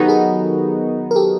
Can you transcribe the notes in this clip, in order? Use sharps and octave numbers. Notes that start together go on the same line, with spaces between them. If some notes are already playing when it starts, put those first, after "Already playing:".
Already playing: D#3 F#3 B3 D#4 F#4 G4 A4
G#4 A#4
A#4
G4 A4